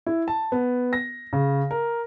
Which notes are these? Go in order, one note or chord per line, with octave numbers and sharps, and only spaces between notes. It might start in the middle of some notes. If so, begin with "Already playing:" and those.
E4
A5
B3
A#6
C#3
A#4